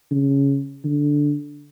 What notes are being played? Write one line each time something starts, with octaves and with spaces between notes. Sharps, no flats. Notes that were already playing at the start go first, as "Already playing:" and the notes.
C#3
D3